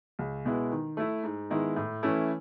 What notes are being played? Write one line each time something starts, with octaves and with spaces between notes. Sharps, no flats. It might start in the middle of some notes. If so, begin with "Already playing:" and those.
C#2
B2 G#3 B3 E4
D#3
A3 E4
G#2
D#3 G#3 B3 E4
A2
E3 A3 C#4 E4